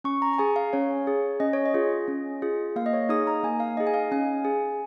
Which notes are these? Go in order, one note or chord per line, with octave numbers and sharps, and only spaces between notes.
C#4 C#6
A#5
A#5
G#4 G#5
F5
C#4 C#5
G#4
C#4 D#5
C#5
D#5
F4 G#4
C#4
F4 G#4
A#3 F5
D#5
C#5
D#4 G#4 D#6
A#5
A#3 G#5
F5
D#4 G#4 D#5
G#5
F5
C#4 G#5
G#4